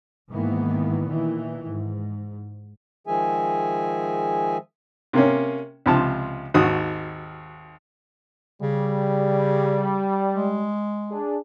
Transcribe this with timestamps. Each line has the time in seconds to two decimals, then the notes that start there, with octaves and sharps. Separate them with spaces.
0.30 G#2 D#3 E3 A#3 B3
1.06 A#2 D#3 E3
1.68 G#2
3.07 D#3 F3 G#3 G#4 E5 G#5
5.13 C3 A#3 C#4
5.86 C#2 C3 F3 A5
6.54 G#1 D#2 F#4 D#6
8.62 C#3 G3
10.35 G#3
11.11 D4 G#4